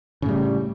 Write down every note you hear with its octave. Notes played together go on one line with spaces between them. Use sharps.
A2 C#3 G3